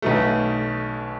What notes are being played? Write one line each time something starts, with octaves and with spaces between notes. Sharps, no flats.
B1 B2 A3